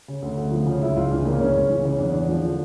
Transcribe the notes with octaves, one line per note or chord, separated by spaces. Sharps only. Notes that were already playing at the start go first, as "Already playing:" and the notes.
C#3
D2
D2
F3
C#3
C#2 E4
C#2 F4
E3 D4
C#3 A#3
C#2 C#4
C#2
E3
C#3
E2 D4
E2
F3
D3